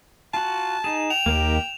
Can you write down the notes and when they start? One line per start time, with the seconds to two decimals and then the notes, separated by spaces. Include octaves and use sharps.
0.34 F4 F#4 A5
0.84 D#4 G#4 E7
1.10 G5 F7
1.26 D#2 A#3 D#4 G4